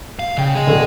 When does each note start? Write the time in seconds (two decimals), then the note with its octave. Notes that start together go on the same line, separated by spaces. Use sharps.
0.19 F5
0.38 C#3 G5
0.55 G#4 D#5
0.67 D1 D3